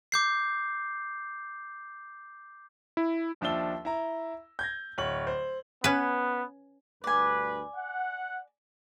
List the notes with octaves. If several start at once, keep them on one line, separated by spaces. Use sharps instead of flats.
D6 G6 C7
E4
D#2 F3 D4 E5 E6 G7
E4 A#5
G6 G#6 A#6
D1 C#5 F#7
C5
B3 C#4 B4
D2 G2 B4 D5 G#5
F#5